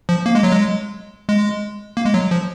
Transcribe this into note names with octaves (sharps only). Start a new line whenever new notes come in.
F3
A#3
G#3
F#3
G#3
G#3
A#3
G#3
F#3
F3